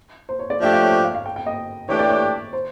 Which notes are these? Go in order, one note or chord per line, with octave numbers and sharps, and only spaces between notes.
C5
C#5
D5
F3 A3 D4 G4 E5
F5
C#5
F5
F5
G5
G5
D#5
E3 A3 D4 G4 C#5
D5
C#5
C5